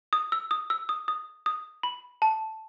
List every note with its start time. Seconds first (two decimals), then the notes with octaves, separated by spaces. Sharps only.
0.13 D#6
0.32 E6
0.51 D#6
0.70 E6
0.89 D#6
1.08 D#6
1.46 D#6
1.83 B5
2.22 A5